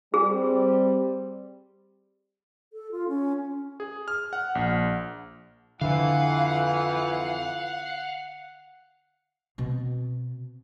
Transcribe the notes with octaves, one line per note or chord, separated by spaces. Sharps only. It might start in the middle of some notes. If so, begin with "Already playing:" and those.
G3 C4 G#4
A4
F4
C#4
G#4
F6
F#5
A#1
F2 D3 E3 F5 F#5
B2 C4